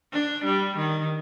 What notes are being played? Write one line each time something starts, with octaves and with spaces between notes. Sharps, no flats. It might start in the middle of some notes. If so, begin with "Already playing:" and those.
D4
G3
D#3